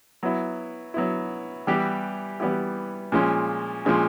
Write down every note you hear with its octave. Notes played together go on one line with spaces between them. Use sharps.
F#3 B3 E4
F#3 B3 E4
E3 G3 B3 E4 G4
E3 G3 B3 E4 G4
A#2 F3 G#3 C#4
A#2 F3 G#3 C#4